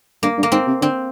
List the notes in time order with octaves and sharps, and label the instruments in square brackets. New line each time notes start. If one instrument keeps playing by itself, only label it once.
[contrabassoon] G2 [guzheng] A#3
[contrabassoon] G2
[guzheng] A#3
[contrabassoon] G#2 [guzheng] C4
[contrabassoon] C3
[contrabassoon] D3 [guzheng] C4